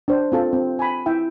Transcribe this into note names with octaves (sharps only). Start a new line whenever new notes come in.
D4 C5 D5
C4 F4 A4
C4
G#5 B5
E4 E5 G5